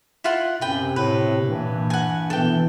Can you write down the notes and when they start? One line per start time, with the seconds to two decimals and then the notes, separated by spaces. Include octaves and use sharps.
0.24 E4 F4 F#5
0.61 F#2 C3 B4 G5
0.96 A2 B4
1.45 G2 A#2 E3
1.90 F#5 G#5
2.30 B2 E3 B3 A4 G5